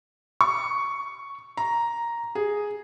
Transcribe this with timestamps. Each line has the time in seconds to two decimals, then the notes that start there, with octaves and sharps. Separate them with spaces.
0.41 C#6
1.57 A#5
2.35 G#4